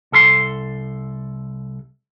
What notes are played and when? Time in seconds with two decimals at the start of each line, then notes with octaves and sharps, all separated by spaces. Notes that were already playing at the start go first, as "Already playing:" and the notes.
0.12 C2 A4 B5 C6